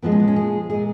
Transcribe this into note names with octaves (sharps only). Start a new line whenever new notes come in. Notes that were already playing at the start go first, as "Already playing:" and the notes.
A#2 F3 G#3 B3
C#4
B3
C#4
G#4
A#2 G#3 G#4